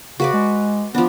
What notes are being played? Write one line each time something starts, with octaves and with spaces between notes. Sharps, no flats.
C#3 F#4 B4 D5
G#3
F3 B3 D4